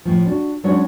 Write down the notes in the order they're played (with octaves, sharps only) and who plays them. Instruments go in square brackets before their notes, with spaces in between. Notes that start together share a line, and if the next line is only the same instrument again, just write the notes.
[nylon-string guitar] A2 F3
D4 F#4
F#3 G#3 C#4 D4 F#4 C#5